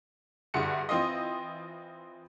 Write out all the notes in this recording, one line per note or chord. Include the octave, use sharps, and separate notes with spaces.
G2 D3 E4 F#4 G#4 C#7
E3 C4 F4 D#5